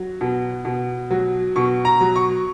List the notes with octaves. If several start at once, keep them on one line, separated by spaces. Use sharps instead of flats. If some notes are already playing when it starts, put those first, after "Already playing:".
Already playing: F#3
B2
B2
F#3
B2 C#6
A#5
F#3
C#6